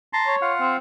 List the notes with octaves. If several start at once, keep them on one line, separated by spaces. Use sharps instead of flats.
A5 A#5 C6
C#5
F4 F5 F#5
C4